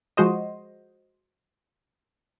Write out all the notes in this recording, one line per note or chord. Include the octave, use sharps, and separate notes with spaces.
F3 G#3 F#4 C5 D#5